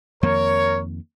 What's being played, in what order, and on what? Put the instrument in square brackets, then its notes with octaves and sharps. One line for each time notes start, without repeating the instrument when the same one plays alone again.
[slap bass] F2 D#3 A#3 [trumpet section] A#4 C#5